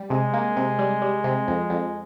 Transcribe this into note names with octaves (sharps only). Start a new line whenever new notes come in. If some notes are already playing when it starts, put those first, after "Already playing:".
Already playing: G3
C3 G#3
A#3
C3
G3
G3
C3
F2
F2